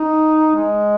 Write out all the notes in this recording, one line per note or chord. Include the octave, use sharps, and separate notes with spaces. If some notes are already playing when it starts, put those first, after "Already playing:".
Already playing: D#4
G#3